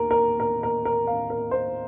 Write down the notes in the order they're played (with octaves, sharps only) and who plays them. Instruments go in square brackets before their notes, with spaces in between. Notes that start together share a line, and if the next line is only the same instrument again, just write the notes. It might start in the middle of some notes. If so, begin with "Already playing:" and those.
Already playing: [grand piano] D#2 A#4
A#4
A#4
A#4
A#4
F5
A#4
C5